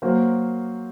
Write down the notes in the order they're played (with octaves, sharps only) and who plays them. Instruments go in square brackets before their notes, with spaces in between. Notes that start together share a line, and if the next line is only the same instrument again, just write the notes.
[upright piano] F#3 A#3 F#4 C5